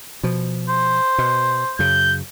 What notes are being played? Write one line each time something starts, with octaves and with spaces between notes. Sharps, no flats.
B2 F3
C5
B2
F#2 C#3 G6